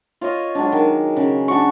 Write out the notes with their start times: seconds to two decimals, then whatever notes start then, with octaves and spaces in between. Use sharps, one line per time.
0.21 F4 C#5 D#5
0.55 F#3 G#3 D4
0.72 D#3
1.17 C#3
1.48 D4 F#4 C#6